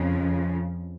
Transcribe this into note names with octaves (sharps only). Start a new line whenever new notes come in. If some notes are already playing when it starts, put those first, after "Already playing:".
Already playing: F2 C#3 F3